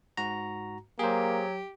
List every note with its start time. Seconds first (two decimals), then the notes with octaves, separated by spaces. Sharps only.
0.17 G#2 F#4 A#5
0.99 F#3 A#3 G4 G#4 C5